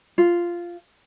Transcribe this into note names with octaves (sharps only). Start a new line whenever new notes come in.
F4